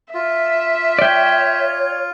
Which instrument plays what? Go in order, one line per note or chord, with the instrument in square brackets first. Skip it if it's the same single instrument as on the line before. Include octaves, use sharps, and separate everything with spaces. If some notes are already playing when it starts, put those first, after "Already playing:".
[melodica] F4 [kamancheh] E5
[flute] C#5 [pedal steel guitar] D5 G5